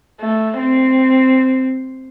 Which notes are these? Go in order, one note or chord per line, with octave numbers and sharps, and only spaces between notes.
A3
C4